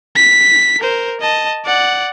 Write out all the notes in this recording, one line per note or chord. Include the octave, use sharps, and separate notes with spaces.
B6
A#4 C5
D#5 A5
D5 F#5